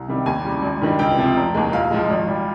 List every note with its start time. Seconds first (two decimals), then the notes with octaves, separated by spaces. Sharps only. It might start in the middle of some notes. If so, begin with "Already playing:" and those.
Already playing: C2
0.08 C3 D#3 G3
0.26 D#2 G#5
0.45 C#3 G3
0.62 G#1
0.81 G2 D#3 G3
0.99 C#2 G5
1.18 C3 F3
1.37 F1
1.54 D#2 D#3 G#3
1.72 A#1 F5
1.91 G#2 F3 G#3
2.10 G#1
2.27 G3